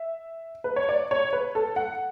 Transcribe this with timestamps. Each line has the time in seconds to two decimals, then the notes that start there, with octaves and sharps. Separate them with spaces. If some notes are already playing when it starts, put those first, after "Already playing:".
Already playing: E5
0.64 B4
0.76 C#5
0.89 D5
1.11 C#5
1.33 B4
1.55 A4
1.76 F#5